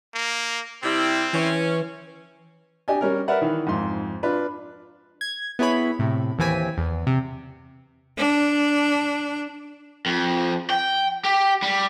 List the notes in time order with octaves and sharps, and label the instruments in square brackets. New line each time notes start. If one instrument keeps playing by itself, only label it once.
[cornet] A#3
[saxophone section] C3 G3 E4 [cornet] C4
[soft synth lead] E3 [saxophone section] C#4
[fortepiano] D4 G4 D#5 G#5
G3 C#4 A#4
A#4 B4 D5 E5 F#5
D#3 E3
F2 G#2 C6
D4 F4 B4
[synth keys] G#6
B3 E4 G#4 C#5 B5
A2 C3
D#2 E3 C4 G#5 B6
E2
C3
[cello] D4
[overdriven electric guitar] F2
G5
G4
G3